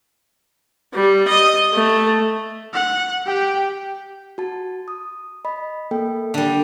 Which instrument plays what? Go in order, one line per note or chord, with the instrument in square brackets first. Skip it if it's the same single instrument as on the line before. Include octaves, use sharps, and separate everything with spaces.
[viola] G3
D#5
A3
[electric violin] F#5
G4 G5
[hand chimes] F#4 A5
D#6
D#5 B5
A#3 A4 G5
[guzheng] D3 G3